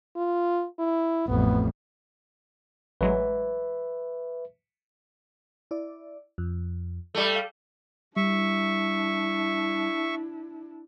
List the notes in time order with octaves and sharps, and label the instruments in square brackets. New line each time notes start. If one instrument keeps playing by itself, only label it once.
[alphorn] F4
E4
[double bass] A1 F2 [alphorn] B3
[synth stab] A1 F#3 G#3 [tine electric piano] B4 E5
[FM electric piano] E4 D5
F2
[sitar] G3 A3
[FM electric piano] F5
[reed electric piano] G3 [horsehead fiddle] D4 E4 [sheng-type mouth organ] E5 C#6